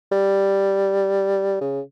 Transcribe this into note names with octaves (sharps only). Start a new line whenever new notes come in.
G3
C#3